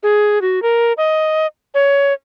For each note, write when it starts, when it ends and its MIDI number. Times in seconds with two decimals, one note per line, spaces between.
0.03 0.41 68
0.42 0.62 66
0.62 0.93 70
0.97 1.47 75
1.74 2.13 73